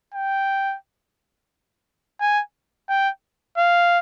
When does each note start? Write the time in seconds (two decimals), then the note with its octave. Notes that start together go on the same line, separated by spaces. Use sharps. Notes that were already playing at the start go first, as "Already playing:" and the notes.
0.14 G5
2.21 G#5
2.89 G5
3.58 F5